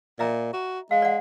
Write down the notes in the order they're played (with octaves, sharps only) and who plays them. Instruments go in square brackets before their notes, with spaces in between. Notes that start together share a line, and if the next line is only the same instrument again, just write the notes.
[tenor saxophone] A#2 [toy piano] D#5 E5 A#5
[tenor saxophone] F#4
[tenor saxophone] G#3 [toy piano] F5
[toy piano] D5 F#5